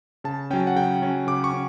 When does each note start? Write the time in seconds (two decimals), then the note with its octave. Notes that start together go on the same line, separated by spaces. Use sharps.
0.24 C#3 A5
0.50 F#3 C#4 G5
0.67 F#5
0.76 C#3 G5
1.02 F#3 C#4
1.27 C#3 D6
1.44 C#6
1.53 C#4